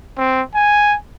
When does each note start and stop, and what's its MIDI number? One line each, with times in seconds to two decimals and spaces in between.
0.18 0.42 60
0.55 0.96 80